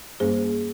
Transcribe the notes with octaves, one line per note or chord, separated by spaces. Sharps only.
G2 G3 A#3 C#4 G#4 C5